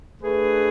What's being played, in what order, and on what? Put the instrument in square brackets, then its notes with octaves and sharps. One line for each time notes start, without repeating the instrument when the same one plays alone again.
[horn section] A3 D4 G#4 B4